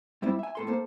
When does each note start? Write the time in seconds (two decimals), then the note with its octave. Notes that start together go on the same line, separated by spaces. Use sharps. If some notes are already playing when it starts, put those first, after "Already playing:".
0.22 G2 G3 C4 E4
0.39 E5 G#5
0.55 A2 A4 C6
0.67 A#3 A4 C5